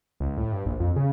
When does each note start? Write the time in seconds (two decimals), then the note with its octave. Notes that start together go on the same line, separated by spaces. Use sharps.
0.20 C#2
0.37 A2
0.52 G2
0.66 A#1
0.80 F2
0.96 C#3